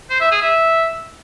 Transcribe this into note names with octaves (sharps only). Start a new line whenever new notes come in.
C5
E5
G#4
E5